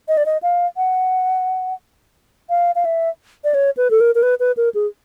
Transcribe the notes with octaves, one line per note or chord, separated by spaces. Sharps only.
D#5
D5
D#5
F5
F#5
F5
F5
E5
D5
C#5
B4
A4
A#4
A#4
B4
B4
A#4
G#4